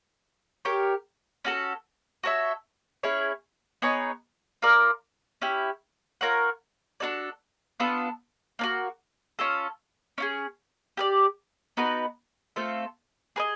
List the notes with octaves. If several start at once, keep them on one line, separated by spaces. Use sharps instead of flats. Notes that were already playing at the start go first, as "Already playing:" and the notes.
G4 A#4 C#5
C#4 F#4 A4
F#4 A4 C#5 E5
C#4 E4 G#4 C#5
B3 D#4 G#4 C#5
F4 A#4 D5
C#4 E4 G4
F4 A#4 C#5 F#5
D4 F#4 A4 D5
B3 D4 F4 A4
A#3 D4 F#4
C#4 F4 A4
C#4 F4 G#4
G4 A#4 D5
B3 D#4 F#4 B4
A3 C4 F4 A4
G#4 B4 D#5